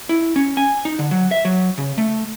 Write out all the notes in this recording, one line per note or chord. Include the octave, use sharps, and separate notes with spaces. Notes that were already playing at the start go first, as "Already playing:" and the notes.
E4
C#4
G#5
D#4
D3
F#3
E5
F#3
C#3
A3